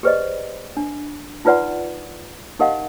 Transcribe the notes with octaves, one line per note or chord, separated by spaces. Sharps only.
G4 G#4 B4 C5 D5 D#5
D4
D#4 F4 B4 D5 F#5 C6
D#4 G4 A#4 D#5 F5 F#5